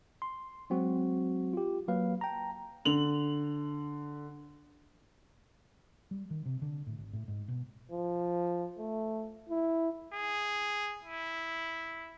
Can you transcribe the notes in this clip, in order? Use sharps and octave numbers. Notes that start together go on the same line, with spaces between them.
C6
F#3 G#3 C4 F#4
F4 G4
F#3 A#3 B4 F5
G5 A5 A#5
D3 F7 F#7
G3
D#3
C3
D3
A2
G#1
A2
G#2
B2
F3
A3
E4
G#4
E4